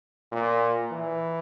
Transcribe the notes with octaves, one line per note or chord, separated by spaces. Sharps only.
A#2
E3